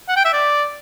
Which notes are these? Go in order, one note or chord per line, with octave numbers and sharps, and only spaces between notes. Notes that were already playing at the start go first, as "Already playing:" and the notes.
F#5
G5
E5
D5